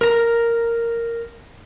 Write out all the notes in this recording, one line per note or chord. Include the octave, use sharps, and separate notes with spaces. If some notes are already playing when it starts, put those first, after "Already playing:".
A#4 A#5